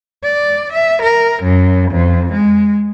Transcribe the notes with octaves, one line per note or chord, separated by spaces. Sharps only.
D5
E5
A#4
F#2
F2
G#3